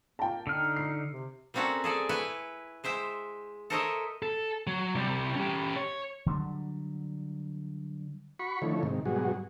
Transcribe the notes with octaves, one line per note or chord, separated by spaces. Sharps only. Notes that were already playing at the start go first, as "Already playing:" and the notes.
A#3 G5 A5
D3 D#4 F6
C7
C3
G3 A#3 C4 C#4 F#4 A4
G#4 A4 D5 G#5
E4 B4 C#5 G5 G#5
G#3 C5 E5 G5
A4 A#4 C5 C#5 D#5 E5
A4
F#3
C3 G3
C#4 G4
C#5
D3 F#3 G3
F#4 B5 C#6
D3 D#3 F3 A3 E4 C#5
G#2 C3 D#3
G#2 B2 F#3 G3 F#4 G#4